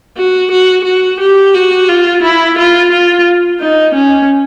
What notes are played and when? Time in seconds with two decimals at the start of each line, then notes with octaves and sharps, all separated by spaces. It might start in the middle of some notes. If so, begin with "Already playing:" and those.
0.17 F#4
0.51 F#4
0.85 F#4
1.20 G4
1.54 F#4
1.88 F4
2.22 E4
2.58 F4
2.92 F4
3.60 D#4
3.94 C#4